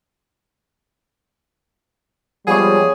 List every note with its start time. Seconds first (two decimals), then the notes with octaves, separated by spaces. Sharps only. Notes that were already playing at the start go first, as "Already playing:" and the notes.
2.47 F3 G3 G#3 B3 G#4 C#5